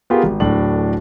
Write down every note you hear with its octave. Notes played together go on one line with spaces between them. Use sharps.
B3 F4 G4 G#4 A#4
G#1
D1 A2 D4 F#7